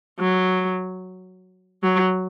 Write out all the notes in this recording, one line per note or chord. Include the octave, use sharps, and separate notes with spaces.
F#3
F#3